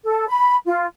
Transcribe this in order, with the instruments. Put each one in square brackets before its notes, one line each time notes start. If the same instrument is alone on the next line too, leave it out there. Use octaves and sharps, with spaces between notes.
[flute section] A4
B5
F4